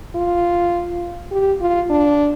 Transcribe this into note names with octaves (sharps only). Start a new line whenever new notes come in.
F4
G4
F4
D4